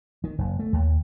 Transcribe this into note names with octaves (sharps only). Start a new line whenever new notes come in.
D#3
F#1
A3
D#2